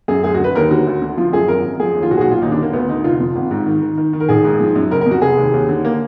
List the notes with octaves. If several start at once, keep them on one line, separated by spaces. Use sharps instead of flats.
F#2 G#4
D2 G#4
F#4
D3 B4
D#2 A#4
D3 F#4
D2
D3
F3 F4
F#2 G#4
G#1 A#4
F#2
F3 G#4
D#2
F4
B1 F#4
G#4
F#4
A#2
F4
D#2 D#4
D4
D3
A#3
D2 B3
D3 D#4
F1 F4
F2
G#1
G#2
D#3
D#3
D#3
D#3
A#4
A#1 G#4
G#2
F3
F#2
F#1 A#4
A#4
F2
F#4
F1 G#4
D#2
D#2
D3
A#3